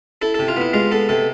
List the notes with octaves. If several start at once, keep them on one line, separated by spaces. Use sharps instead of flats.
E4 A4
C3 A4
F4
B3 E4
G#3 F4
B3 A4
C3 A4